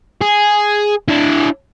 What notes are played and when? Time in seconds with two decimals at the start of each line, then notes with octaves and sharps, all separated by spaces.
0.21 G#4
1.08 D4 E4